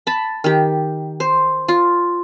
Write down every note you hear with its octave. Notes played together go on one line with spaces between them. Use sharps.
A5 B5
D#3 G4
C5
F4